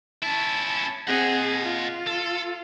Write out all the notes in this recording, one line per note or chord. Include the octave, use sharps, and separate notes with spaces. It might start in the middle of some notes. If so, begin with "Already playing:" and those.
C#4 E4 A5
C4 G#4 D#5 F#5
F4
A4